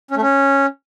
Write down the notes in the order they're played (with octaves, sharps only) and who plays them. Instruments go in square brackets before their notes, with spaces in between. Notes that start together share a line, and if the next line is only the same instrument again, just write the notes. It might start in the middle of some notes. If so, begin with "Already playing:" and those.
[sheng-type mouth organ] C#4
A3
C#4